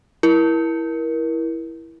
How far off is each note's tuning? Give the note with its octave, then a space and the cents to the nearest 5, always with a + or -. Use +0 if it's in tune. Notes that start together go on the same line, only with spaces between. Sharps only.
E4 +0 A#4 +25